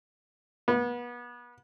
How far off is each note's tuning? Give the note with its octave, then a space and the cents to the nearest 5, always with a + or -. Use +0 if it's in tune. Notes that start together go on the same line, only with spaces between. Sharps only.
B3 -30